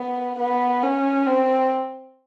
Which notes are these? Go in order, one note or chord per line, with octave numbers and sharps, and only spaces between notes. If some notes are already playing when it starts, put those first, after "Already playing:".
Already playing: B3
B3
C#4
C4